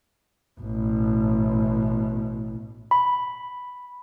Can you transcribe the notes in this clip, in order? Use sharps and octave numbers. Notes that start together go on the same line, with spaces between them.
A1 B2
B5